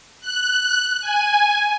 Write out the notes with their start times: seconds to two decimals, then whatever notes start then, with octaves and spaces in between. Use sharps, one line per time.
0.21 F#6
1.00 G#5